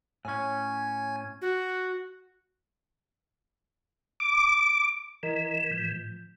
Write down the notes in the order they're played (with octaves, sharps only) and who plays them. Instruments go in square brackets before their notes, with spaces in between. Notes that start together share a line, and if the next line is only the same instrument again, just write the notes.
[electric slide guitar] A2 C#4 [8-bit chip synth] G#5 G#6
[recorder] F#4
[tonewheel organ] D6
[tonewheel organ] E3 [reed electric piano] E4 A#4 D#5
[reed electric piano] A2 F3 G6